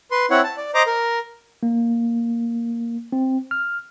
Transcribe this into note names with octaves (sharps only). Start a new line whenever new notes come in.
B4 C6
C4 E4 C#5 F#5
A5
D5
C5 D#5 A#5 D6
A#4
A#3
C4
F6